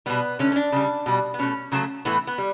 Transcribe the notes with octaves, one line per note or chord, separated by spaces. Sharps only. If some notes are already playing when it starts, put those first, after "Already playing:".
B2 G3 B3
D3 A3 C#4
C#4
D4
C#3 G3
B2 G3
B3
B2 A3 C#4
C#3 F#3 A3
A2 E3 A3 B3
B3
G3